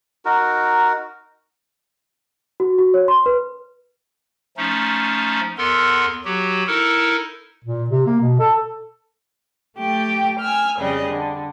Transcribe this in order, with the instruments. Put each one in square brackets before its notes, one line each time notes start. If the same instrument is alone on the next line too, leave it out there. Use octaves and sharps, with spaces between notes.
[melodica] D#4 F#4 A#4
[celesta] F#4
F#4
C#5
C6
B4
[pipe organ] F3 A3 C#4 D#4
E2 B3 A4 A#4 C6
F#3 F#4 G4
D#4 E4 A4 A#4
[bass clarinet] A#2
C3
A#3
B2
A4
[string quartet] A3 G4 G5
G#5 E6 F6
F2 C#3 G3 G#4 D#5
D3